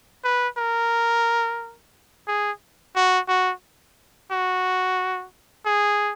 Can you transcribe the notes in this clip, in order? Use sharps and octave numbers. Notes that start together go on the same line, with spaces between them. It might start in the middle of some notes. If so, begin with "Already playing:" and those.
B4
A#4
G#4
F#4
F#4
F#4
G#4